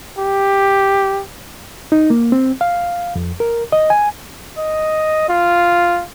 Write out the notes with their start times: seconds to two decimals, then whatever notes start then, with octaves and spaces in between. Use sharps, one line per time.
0.18 G4
1.92 D#4
2.10 A#3
2.32 C4
2.61 F5
3.15 F2
3.40 A#4
3.72 D#5
3.90 G#5
4.59 D#5
5.29 F4